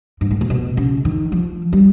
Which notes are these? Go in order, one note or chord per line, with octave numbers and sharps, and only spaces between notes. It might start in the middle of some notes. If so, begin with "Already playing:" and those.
G#2
A2
A#2
B2
C#3
D#3
F3
G3